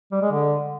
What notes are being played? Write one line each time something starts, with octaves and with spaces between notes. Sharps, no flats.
G3
G#3
D3